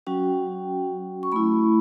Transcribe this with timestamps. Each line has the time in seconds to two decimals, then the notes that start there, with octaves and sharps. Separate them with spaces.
0.07 F#3 C#4 F#4 G5
1.23 C#6
1.32 A3 E4 B5